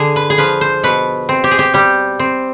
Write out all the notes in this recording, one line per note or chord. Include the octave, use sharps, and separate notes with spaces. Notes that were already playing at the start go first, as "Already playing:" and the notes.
Already playing: D3 G#4
B4
G#4
F3 B4
C5
B2 B4
C4
G4
G#4
G4
G3 G4
C4